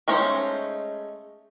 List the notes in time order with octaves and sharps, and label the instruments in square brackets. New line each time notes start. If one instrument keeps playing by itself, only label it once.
[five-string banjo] G#3 A3 C#4 D#4 C5